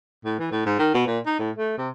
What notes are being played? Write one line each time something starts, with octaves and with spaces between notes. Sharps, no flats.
A2
E3
A2
G#2
D#3
B2
A#2
D#4
A2
A3
C3